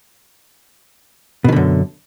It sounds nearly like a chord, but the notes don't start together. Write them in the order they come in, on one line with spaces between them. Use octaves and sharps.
B2 D#3 D3 F#2